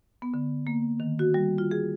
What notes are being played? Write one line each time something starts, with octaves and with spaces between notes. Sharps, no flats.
B3
D3
A#3
D#3
F#4
G3
F4
G#4